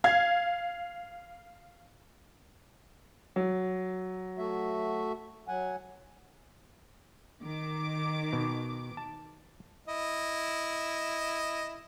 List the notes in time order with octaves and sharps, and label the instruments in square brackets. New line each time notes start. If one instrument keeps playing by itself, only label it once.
[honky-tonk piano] F5 G#6
[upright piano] F#3
[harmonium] A3 F#4 E5
F#3 F#5 G#5
[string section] D#3 D6
[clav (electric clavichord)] B2
A5
[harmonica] E4 D#5